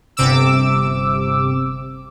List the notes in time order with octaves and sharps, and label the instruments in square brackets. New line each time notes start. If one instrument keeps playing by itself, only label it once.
[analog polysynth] G1 C3 D6 E6